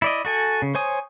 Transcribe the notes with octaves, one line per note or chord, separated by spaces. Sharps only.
E4 D5 D#5
F#4 A4 G#5
C#3
C5 C#5 G#5 D#6